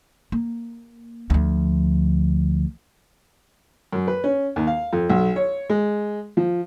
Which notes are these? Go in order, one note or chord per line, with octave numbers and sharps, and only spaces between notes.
A#3
D2 F3
F#2
B4
C#4
D#2
F5
F2
B1
C#5
G#3
F3